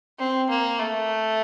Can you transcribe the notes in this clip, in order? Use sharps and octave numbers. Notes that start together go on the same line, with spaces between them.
C4
A#3
A3